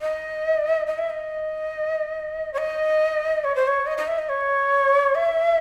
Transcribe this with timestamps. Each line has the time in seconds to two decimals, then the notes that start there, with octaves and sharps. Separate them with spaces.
0.01 D#5
0.87 D#5
0.98 E5
1.10 D#5
2.53 C#5
2.58 D#5
3.44 C#5
3.55 C5
3.68 C#5
3.86 D#5
3.98 D#5
4.08 E5
4.18 D#5
4.29 C#5
5.15 E5